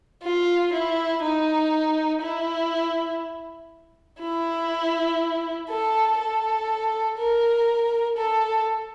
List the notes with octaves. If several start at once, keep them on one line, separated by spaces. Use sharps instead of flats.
F4
E4
D#4
E4
E4
A4
A4
A#4
A4